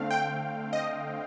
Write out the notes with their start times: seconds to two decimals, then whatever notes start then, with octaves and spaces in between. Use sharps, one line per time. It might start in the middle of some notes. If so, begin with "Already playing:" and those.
Already playing: D3 A3 C4 F5
0.11 G5
0.73 D#5